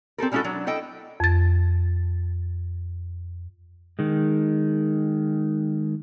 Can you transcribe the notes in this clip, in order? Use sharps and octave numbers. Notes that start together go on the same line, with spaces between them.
C4 G4 A4 A#4
G3 G#3 C#4 E4 F#4 A4
F#3 D4
E4 A4 D#5 G5
F2 A6
D#3 G#3